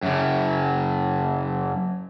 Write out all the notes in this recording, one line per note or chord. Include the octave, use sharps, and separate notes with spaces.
F#2 C#3